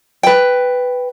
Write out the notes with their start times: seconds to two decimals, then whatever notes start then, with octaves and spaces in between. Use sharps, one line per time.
0.23 B4 G5